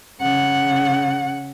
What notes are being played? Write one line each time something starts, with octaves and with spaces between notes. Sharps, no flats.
C#3 F#5